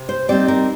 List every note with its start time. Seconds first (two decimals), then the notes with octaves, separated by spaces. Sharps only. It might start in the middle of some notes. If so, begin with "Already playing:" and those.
Already playing: C3
0.09 C5
0.29 G3 C4 D#4 D5
0.48 A#4